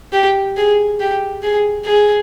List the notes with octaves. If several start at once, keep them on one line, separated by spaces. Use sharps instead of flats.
G4
G#4
G4
G#4
G#4